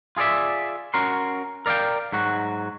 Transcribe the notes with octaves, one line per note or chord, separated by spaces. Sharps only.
F4 G#4 A4 D5 E5
C#4 F#4 A#4 C6
A#4 D5 D#5 F5 G5
G#2 F#3 F#4